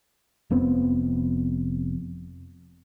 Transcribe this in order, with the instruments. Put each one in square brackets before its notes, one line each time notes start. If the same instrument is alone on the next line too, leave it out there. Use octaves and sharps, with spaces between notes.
[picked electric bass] F1 F2 B3 C4